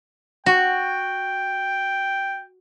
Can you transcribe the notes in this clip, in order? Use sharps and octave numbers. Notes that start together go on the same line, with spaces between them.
F#4 G5